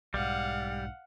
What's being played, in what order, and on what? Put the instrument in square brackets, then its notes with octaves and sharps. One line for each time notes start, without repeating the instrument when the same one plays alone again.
[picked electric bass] B1 G#2 [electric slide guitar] G3 [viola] F5 F#5